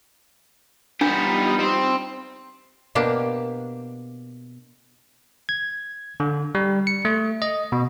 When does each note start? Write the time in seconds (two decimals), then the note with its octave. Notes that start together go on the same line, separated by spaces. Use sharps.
1.01 G3 B3 D4 D#4 F4 G4
1.60 C4
2.95 B2 A#3 D4 G4
5.49 G#6
6.20 D3
6.55 G3
6.87 C#7
7.05 A3
7.42 D#5
7.72 B2